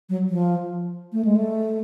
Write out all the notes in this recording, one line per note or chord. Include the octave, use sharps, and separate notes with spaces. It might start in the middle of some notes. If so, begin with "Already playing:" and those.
F#3
F3
A3
G#3
A3